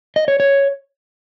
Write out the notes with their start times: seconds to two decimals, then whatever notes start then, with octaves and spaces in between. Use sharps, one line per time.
0.16 D#5
0.28 C#5
0.40 C#5